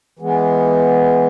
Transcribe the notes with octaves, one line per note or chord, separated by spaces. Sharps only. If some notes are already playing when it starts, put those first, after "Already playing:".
E3 G#3 B3